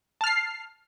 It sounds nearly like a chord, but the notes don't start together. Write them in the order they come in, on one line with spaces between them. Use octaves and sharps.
A5 F6 C7